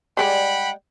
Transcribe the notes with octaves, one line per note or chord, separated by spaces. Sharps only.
G3 G#3 D5 F#5 G5 B5